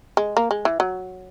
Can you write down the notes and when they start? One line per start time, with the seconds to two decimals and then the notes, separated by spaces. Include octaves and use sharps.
0.17 G#3
0.37 A#3
0.51 G#3
0.65 E3
0.80 F#3